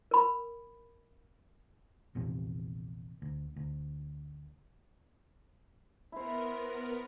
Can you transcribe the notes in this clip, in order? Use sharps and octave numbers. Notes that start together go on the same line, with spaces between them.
A#4 B5
A#1 E2 C3
D2
D2
B3 E4 A#4 C5